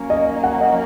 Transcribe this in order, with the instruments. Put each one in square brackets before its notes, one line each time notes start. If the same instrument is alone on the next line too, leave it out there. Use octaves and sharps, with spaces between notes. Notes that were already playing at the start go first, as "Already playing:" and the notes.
Already playing: [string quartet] F#3 A#3 C#4
[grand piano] D#5
F#5
D#5